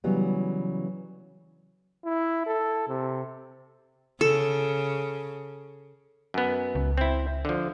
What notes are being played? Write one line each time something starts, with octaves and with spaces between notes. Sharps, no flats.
C#3 E3 F#3 G3 B3
E4
A4
C3
C#3 A4
F#2 B3
C#2
C4 E4
D3 F3